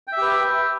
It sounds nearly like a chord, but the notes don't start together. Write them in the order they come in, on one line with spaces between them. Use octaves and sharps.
G5 E5 G4 B4